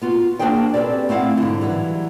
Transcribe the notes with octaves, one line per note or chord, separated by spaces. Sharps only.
B3 F4 F#4
A#3 D4 F#4 G#4 C5 G5
C4 C#4 G4 A4 B4 D5
A3 C4 E4 F5 F#5
G#2 D3
E3 F#3 G3